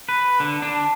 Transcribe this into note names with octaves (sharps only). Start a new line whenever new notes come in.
B4
D3
D4